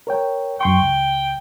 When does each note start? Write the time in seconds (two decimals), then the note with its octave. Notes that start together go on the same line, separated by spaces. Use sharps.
0.07 A#4 C#5 G5
0.61 F#2 G5 C6 C#6
0.82 C#2